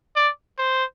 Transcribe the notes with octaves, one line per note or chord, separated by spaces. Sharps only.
D5
C5